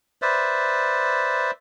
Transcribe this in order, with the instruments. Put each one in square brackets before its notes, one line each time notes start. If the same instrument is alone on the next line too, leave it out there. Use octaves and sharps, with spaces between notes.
[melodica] B4 C5 D5 E5